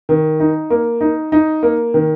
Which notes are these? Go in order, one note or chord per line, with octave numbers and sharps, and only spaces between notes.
D#3
D#4
A#3
D#4
D#4
A#3
D#3